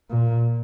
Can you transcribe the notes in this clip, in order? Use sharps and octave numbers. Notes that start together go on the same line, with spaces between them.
A#2